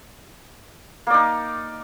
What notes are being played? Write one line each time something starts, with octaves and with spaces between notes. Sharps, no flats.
A#3 D#4 D5